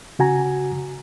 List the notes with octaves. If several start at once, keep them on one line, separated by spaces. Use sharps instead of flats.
C#3 F#4 G#5 A#5